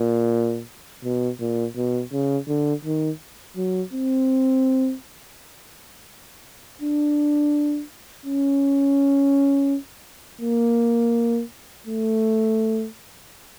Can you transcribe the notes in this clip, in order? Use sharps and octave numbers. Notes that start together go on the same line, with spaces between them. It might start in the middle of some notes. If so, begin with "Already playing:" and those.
Already playing: A#2
B2
A#2
B2
C#3
D3
D#3
F#3
C4
D4
C#4
A#3
A3